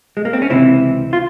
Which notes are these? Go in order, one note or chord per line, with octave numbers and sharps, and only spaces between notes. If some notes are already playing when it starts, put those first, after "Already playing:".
G#3
A#3
C4
C#4
C#2 C3 E3 C4 E4
F4